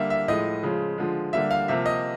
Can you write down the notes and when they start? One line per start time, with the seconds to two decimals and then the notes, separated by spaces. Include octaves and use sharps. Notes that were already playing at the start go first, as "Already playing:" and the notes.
Already playing: D3 G3 A#3 E5
0.10 E5
0.28 A2 F3 G#3 D#5
0.63 C#3 F3 G#3
0.98 D3 F3 G#3
1.33 D3 G3 A#3 E5
1.51 F5
1.68 C3 F3 A#3 E5
1.86 D#5